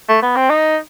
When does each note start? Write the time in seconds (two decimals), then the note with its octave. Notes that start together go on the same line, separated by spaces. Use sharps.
0.09 A3
0.23 B3
0.36 C4
0.50 D#4